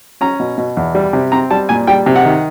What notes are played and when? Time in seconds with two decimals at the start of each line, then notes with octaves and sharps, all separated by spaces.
0.21 C#4 A#5
0.40 B2
0.58 B2
0.77 E2
0.95 G3
1.13 C3
1.32 C4 A#5
1.51 G3 A5
1.69 A#2 G#5
1.87 G3 G5
2.06 C3
2.16 F#5
2.25 D#3